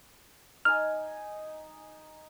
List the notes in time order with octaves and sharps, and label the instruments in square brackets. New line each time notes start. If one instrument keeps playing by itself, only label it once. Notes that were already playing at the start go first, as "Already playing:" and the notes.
[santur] D#4 D#5 G#5 [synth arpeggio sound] F6